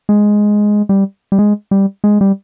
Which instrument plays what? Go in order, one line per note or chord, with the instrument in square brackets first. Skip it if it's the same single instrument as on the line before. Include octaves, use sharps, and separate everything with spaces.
[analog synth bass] G#3
G3
G3
G#3
G3
G#3
G3